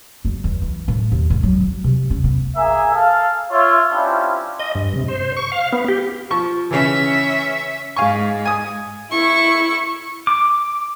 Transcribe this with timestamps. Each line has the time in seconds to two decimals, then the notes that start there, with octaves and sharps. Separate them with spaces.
0.25 F#1
0.44 E2
0.61 E3
0.88 A2
1.12 D#2
1.30 G#2
1.43 F#3
1.60 F#3
1.84 C3
2.10 C#4
2.24 B3
2.57 A#3 G#4 E5 G#5
2.94 A4 F5
3.51 F4 C#5 E5
3.92 G3 C#4 D4 E4 F4 C5
4.60 D#5
4.75 G2
4.96 C3
5.08 C5
5.37 C#6
5.52 F5
5.73 B3
5.88 G4
6.31 F3 C#6
6.71 C#3 E3 C#4 E5
7.96 G#2 F5 G#5 C#6
8.45 G#5 D#6
9.12 E4 C#6
10.27 D6